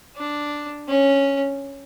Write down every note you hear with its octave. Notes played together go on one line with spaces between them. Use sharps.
D4
C#4